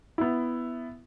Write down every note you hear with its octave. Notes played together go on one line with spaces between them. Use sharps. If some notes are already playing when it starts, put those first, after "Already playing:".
B3 E4